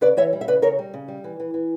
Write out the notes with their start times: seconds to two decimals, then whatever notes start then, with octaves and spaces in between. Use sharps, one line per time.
0.01 C#3 B4 D5
0.17 E3 C#5 E5
0.33 G3
0.41 E5
0.48 C#3 B4 D5
0.62 C#3 A#4 C#5
0.79 G3
0.94 C#3
1.08 G3
1.24 E3
1.40 E3
1.54 E3